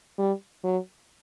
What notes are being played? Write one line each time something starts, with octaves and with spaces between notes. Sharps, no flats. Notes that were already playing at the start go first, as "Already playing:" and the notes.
G3
F#3